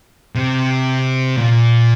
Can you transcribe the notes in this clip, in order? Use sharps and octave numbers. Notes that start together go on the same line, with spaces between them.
C3
A#2